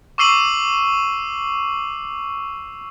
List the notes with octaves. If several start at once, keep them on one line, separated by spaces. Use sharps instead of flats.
C#6 D6 E6 C7 D#7 F#7